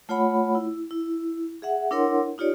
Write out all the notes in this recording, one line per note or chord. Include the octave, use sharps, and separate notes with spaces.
A3 F4 C#5 F#5 B5
E4
E4
G#4 E5 F#5
D4 E4 A#4 C#5 F#5 C6
D#4 F4 G4 C#5 D5